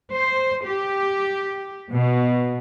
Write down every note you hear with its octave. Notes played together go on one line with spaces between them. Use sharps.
C5
G4
B2